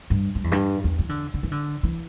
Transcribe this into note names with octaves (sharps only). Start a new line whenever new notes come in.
G2
G2
E2
G2
E2
E3
D3
D3
E3
D3
E3